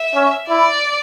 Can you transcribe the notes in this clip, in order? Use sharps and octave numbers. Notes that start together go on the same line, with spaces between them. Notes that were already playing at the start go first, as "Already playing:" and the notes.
Already playing: E5
C#4
E4 D5